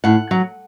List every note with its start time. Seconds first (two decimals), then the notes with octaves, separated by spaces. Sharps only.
0.04 A2 F#5
0.31 F#3